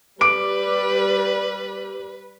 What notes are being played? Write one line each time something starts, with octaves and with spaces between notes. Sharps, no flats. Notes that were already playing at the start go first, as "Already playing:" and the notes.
G3 B4 D6 D7